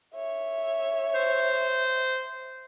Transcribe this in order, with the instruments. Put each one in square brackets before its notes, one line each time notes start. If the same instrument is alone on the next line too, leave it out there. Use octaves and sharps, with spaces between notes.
[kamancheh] C#5 E5
[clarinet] C5